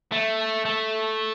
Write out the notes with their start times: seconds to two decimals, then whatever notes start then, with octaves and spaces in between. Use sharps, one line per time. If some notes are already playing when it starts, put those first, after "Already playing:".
0.12 A3
0.66 A3